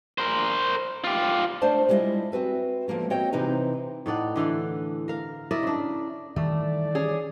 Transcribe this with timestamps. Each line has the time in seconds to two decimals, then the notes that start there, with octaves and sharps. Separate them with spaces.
0.18 A#4 C5
1.04 F4 G4
1.62 A3 D4 C5 D5 A5
1.89 G3 G#3 B3 E4 F4 D#5
2.32 C4 F#4 B4 E5
2.88 D3 F3 G#3 A#3 B3
3.10 A#3 C4 F#4 C#5 D#5 G5
3.32 C3 E3 C4 D#4 B4 A#5
4.06 A2 D#4 D5 F#5
4.36 D3 E3 F5 F#5
5.08 A#4 F5
5.51 E4 A#4 D5 D#5
5.63 C#3 D4
6.36 D#3 E3 G3 A3 D5
6.95 C#4 G#4